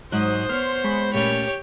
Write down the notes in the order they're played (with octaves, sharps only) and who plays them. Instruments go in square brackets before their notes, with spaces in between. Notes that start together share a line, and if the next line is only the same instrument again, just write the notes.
[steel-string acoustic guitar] G#2 F#3 [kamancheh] C5 [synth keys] D#6 F#6
[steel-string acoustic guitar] B3 C#5 [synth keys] C6 F6
[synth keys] G#3 B5 C#6
[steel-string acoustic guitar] A#2 A3 C#4 [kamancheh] G4 C#5